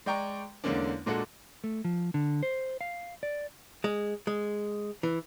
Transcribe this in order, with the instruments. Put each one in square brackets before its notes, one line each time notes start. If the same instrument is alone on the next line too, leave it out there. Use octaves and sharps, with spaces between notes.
[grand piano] G#3 D5 G5 A#5 C#6
E2 D3 G#3 A#3 C#4 D4
A#2 G#3 D4 F#4 A4
[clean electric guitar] A3
F3
D3
C5
F5
D5
[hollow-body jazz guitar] G#3
G#3
E3